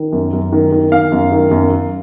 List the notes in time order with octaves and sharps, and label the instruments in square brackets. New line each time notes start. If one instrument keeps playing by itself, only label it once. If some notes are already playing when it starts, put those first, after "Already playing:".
Already playing: [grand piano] D#3
F#2
F#2
D#3
D#3
D#3 F5
F#2
D#3
F#2
F#2